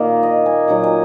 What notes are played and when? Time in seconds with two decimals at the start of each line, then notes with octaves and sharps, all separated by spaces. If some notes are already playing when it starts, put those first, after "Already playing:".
Already playing: A#2 D#3 A#3 D#4
0.23 D#5
0.46 G#5
0.68 A#2 F#3 D#4 F#5
0.84 G#5